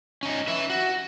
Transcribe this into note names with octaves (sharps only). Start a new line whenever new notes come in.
C#4 D#4
B4 E5
F#4